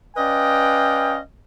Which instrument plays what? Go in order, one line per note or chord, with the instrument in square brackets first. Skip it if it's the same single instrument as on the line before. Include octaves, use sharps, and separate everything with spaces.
[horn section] C#4 B4 D5 D#5 F5 G5